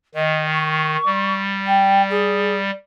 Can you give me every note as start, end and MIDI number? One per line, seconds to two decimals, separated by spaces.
0.15 0.97 51
0.15 0.46 75
0.51 1.36 85
1.06 2.71 55
1.66 2.02 79
2.09 2.55 68